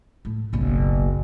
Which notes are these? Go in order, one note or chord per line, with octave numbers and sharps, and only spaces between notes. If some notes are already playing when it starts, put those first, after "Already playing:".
A2
F#1 B1